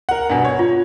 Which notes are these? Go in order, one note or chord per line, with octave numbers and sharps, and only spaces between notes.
A#4 F#5
G2 B2 F#5 G#5
C#5
F4